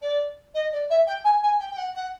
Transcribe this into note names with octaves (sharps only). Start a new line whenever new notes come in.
D5
D#5
D5
E5
G5
G#5
G#5
G5
G5
F#5
F#5